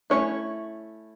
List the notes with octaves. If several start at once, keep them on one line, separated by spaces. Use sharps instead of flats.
A3 C#4 E4 C#5